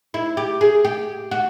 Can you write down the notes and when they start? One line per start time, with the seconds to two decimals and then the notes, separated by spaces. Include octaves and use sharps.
0.14 E4
0.37 G4
0.61 G#4
0.85 G4
1.31 F#4